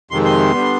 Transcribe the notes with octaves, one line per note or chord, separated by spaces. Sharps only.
F2 C3 D#3 G#3 C6
C6
D3 G3 B3